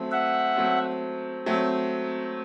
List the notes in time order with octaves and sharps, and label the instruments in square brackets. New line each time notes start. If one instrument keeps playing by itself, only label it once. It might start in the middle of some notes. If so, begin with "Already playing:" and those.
Already playing: [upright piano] F#3 A3 C4
[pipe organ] E5 F#5
[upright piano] F#3 A3 C4
F#3 A3 C4